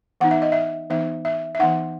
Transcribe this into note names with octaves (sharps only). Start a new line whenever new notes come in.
E3 B3 D#4 F#5
E5
D#5
E5
E3 B3 D#4 E5
E5
E5
E3 B3 D#4 F#5